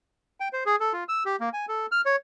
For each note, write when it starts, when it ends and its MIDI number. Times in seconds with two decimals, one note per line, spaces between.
0.40 0.48 79
0.53 0.64 72
0.66 0.76 68
0.80 0.93 69
0.93 1.04 65
1.09 1.23 88
1.25 1.36 67
1.40 1.49 58
1.53 1.65 80
1.69 1.86 69
1.92 2.01 89
2.06 2.16 73